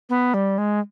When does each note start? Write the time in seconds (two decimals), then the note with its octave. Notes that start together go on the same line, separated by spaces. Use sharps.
0.09 B3
0.34 G3
0.58 G#3